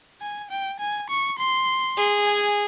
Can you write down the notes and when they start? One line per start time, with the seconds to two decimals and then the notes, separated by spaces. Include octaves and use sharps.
0.21 G#5
0.50 G5
0.80 G#5
1.09 C#6
1.38 C6
1.97 G#4
2.27 G#5